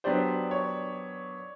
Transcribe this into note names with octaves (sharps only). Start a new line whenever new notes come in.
F#3 B3 D4 G4 C5 D5
C#5